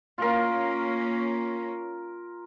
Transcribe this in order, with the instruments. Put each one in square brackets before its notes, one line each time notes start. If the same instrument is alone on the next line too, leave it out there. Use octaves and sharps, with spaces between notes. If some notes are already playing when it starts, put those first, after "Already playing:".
[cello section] A#3 C#4 [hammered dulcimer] F4 A#4